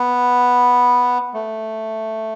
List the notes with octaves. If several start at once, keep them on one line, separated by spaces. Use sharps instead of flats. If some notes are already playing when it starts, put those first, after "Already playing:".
Already playing: B3
A3